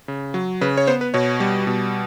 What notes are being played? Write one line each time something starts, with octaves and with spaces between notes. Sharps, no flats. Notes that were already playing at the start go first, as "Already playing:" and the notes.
C#3
F#3
C#3 B4
C#5
B3 C5
B4
B2 C#5
G3
B2